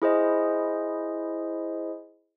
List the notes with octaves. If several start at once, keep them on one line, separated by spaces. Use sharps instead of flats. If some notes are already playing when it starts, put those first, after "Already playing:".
E4 G#4 C5 D#5